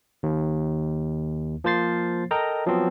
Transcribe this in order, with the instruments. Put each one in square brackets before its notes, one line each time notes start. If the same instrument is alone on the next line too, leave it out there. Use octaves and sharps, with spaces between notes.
[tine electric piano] D#2
F3 A#3 C5 A6 C7
A4 A#4 D#5 G5 A#5
F3 F#3 B3 C4